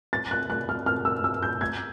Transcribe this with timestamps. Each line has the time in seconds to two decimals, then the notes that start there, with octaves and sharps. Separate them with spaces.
0.13 A6
0.31 F#6
0.50 F#6
0.69 F6
0.86 F6
1.05 E6
1.24 E6
1.42 G6
1.61 G#6